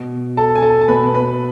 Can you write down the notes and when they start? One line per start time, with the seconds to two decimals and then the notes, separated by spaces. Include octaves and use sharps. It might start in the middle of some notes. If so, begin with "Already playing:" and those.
Already playing: B2
0.37 A4 A5
0.56 G#5
0.62 A4 A5
0.81 A5
0.88 B2 B4 B5
1.14 B4 B5